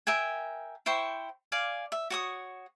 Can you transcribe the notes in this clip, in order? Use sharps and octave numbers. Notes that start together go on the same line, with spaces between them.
A#4 E5 G5 G#5
E4 C5 G5 C#6
D5 F5 G#5
E5
F#4 C#5 D#6